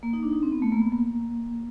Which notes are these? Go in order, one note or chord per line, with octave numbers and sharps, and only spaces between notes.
A#3
D#4
D4
D#4
C4
B3
A3
A#3
B3
A#3